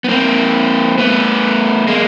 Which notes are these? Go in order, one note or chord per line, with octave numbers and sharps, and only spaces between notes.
B3
A#3 C4
A3 B3
G#3 A#3